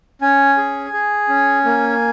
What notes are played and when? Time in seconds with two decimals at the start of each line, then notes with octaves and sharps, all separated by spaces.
0.21 C#4 G#5
0.57 G#4
0.93 G#4
1.29 C#4
1.65 A#3